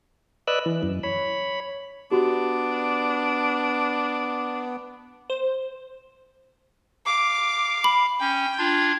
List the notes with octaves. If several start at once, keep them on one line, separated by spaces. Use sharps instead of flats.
B4 D5 D#5 E6 F#6
E3
F#2
C#5 B5
B3 D4 F#4 G4
C5
F5 D6
B5
C#4 G5
D4 F4 G#6